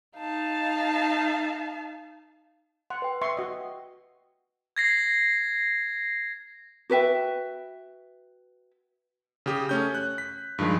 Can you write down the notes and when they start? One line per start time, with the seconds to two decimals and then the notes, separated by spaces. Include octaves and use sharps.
0.17 D#4 F5 A5
2.90 F#5 C6
3.02 B4 G5
3.22 E5 C6 C#6
3.37 F#4 D#5
4.76 G#6 A#6 C7
6.90 F#4 B4 E5 G5
9.46 C#3 G4 D#6
9.69 A3 C#4 G6
9.95 F#6
10.18 B6
10.58 G2 D#3 F3 G#3